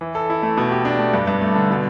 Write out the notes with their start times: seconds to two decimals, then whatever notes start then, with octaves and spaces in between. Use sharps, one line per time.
0.01 E3
0.15 A4
0.30 E4
0.43 A3
0.57 B2
0.72 G4
0.85 D4
0.99 A3
1.13 G2
1.27 G2
1.41 A3
1.55 D3
1.70 B2